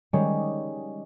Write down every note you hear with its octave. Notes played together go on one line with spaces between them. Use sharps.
D#3 G3 G#3 C#4 C#5